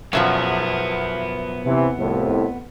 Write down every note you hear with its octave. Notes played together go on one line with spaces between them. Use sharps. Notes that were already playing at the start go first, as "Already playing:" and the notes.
F#2 B2 F3 B3 E5
C3 E3
C2 F2 A2